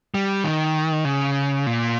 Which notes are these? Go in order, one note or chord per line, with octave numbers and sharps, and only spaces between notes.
G3
D#3
C#3
A#2